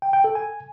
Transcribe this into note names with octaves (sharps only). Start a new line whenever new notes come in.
G5
G5
A4
G#5